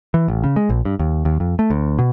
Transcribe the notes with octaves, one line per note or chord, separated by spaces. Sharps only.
E3
A1
C#3
G#3
A#1
G2
D#2
D#2
F2
A3
D2
B2